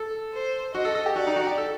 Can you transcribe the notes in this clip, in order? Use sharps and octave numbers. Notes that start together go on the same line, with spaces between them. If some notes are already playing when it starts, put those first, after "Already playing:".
Already playing: A4
C5
F#4 D#5
A4
A4
G4
F#4 D5
D#4
F#4
G4
A4